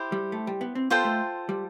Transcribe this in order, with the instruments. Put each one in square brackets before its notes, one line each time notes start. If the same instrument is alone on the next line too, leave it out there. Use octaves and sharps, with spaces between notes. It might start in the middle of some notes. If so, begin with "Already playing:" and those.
Already playing: [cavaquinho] E4 G4 C5
[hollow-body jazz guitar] G3
A3
G3
B3
C4
[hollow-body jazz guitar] B3 [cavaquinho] F4 A4 C5 G5
[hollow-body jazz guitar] A3
G3